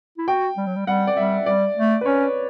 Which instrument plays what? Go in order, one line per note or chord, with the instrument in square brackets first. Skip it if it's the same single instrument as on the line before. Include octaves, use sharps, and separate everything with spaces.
[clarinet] E4
[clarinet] F#4 [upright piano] G5
[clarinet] G3
F#3
G3
[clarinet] G3 [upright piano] F#5
[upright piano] D5
[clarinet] G3 [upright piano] E5
[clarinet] G3 [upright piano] D5
[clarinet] A3
[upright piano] B4
[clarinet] C#4 [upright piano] C#5